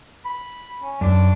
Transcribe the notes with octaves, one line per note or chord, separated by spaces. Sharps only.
B5
C#4
F#2 D4